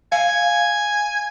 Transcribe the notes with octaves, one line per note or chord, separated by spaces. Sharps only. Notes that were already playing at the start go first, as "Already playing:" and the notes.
F5 G#5